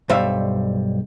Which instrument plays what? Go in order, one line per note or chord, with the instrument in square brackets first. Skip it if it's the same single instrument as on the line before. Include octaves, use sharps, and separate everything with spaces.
[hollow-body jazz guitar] B1 G2 G3 C5 E5 F5